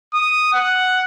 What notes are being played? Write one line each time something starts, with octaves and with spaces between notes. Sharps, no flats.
D#6
F#5